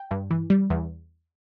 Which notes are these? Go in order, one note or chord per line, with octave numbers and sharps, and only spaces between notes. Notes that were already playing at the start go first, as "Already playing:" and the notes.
Already playing: G5
G2
E3
G3
E2